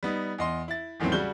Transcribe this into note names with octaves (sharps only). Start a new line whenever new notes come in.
G3 B3 D#4
E2 D#5 C6
E4 A6
G#1 E2 A2 D#3 F#3 C4
C#3 G3 F#4 G6 G7